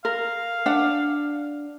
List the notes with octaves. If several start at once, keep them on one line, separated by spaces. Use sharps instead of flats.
A#4 F5
D4 F#5